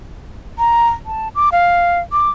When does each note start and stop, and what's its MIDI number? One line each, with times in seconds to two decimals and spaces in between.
0.59 0.88 82
1.06 1.28 81
1.35 1.49 86
1.52 2.00 77
2.12 2.30 86